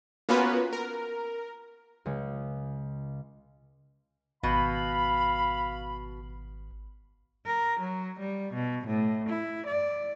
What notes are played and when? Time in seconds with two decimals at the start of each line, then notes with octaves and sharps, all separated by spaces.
0.29 A#3 B3 C#4 F4 F#4 B4
0.73 A#4
2.06 C#2 G#3 C#5
4.43 G#1 B2 F5 B5
7.46 A#4
7.80 F#3
8.20 G3
8.54 B2
8.87 A2
9.29 E4
9.66 D5